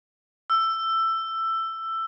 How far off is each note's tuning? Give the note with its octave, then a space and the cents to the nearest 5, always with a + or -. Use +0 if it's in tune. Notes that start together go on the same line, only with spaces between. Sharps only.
E6 +15